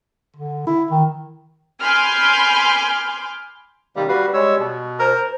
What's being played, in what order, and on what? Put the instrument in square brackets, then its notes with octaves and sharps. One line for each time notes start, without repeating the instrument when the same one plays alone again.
[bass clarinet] D3
E4
D#3
[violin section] G#5 B5 C6 D6 F6 G6
[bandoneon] C3 D#3 A#3 [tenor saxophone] G3
[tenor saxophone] G3 [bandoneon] F#4 B4 F5
[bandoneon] G#3 C#5 E6
B2
[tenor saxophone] A#4 [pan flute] C5